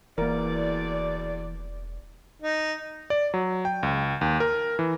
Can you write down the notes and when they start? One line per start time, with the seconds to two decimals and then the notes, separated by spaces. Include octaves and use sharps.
0.18 E1 E2 B2 E3 A#3 A#4 D5
2.42 D#4
3.10 D5
3.34 F#3
3.65 G5
3.83 C#2
4.21 D#2
4.40 A#4
4.79 E3